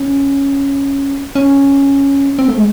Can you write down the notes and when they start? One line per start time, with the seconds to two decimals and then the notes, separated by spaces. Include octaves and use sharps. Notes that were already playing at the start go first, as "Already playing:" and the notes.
Already playing: C#4
1.35 C#4
2.39 C4
2.48 A3
2.57 G#3